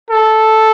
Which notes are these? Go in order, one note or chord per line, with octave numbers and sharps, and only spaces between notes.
A4